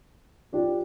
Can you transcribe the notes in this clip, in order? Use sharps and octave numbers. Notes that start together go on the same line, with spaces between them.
F3 D4 G4